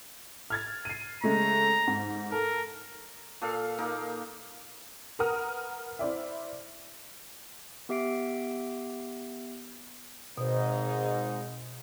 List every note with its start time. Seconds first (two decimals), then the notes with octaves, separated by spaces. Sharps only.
0.50 F6 G#6 A6
0.85 C7 D#7
1.24 C#3 G#3 A3 A#5
1.87 G#2
2.32 A4 A#4
3.41 A#2 A4 F5
3.78 A#3 D#4 D6
5.19 A#4 B4 F#5 A#5 D#6 F6
5.99 E4 C5 D5 E5
7.89 B3 G4 E5 C7 D7
10.38 G#1 G#2 B2 D#4 C5